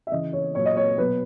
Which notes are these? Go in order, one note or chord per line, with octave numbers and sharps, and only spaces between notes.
E5
C#3 E3 D#5
C#5
A#2 F#3 C#5
D#5
C#5
B2 F#3 B4